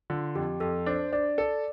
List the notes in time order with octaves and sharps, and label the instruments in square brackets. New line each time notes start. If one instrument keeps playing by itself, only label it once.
[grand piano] D3 [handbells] F4
[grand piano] F2 [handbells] G4
[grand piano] F2 [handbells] A4
[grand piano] D4 [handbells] C5
[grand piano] D4 [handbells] D5
[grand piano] A4 [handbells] D5